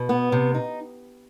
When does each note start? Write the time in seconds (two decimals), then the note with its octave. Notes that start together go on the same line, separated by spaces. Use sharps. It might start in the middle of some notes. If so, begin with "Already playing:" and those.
Already playing: B2
0.09 B3
0.32 C3
0.54 D#4